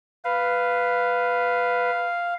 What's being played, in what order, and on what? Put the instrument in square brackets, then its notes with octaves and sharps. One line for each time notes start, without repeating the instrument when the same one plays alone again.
[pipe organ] B4 [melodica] F5